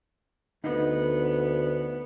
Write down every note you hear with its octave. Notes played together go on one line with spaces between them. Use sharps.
D2 B3 D#4